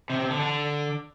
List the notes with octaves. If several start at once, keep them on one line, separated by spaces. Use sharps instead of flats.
C3
C3
D3
D3